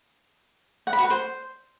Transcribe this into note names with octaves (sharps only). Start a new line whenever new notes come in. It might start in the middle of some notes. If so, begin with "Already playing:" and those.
F#5
B5
F#4
B4
C5